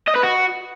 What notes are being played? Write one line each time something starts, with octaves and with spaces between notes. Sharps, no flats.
D#5
B4
F#4